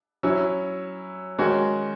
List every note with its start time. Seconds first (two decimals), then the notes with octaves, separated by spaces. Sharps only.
0.23 F#3 C#4 E4
1.39 D#3 G#3 C#4 F#4